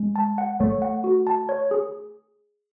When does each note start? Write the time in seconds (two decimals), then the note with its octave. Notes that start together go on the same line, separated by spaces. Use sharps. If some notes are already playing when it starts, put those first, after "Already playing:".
Already playing: G#3
0.16 A5
0.38 F#5
0.60 A3 C#5
0.82 F#5
1.04 F#4
1.27 A5
1.49 C#5
1.71 G#4